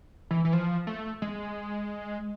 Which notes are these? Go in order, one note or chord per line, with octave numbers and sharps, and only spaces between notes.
E3
E3
F3
A3
G#3